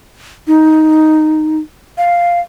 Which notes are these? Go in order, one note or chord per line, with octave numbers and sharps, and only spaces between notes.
D#4
F5